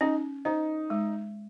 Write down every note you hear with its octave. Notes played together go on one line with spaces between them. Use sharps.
C#4 D#4
D#4 C5
G#3